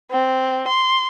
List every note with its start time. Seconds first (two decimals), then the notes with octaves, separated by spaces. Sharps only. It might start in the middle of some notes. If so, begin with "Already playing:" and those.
0.11 C4
0.68 C6